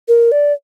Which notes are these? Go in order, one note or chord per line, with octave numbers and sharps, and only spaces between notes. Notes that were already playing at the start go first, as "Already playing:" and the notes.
A#4
D5